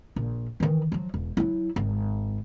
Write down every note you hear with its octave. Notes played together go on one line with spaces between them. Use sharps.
A#1
D#3 E3
F3 F#3
E1
F#3 E4
G#1